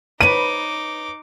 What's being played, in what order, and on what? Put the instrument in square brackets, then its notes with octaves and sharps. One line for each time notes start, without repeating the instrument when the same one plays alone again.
[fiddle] D#4 D6 [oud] B4 C#5 [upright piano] D#7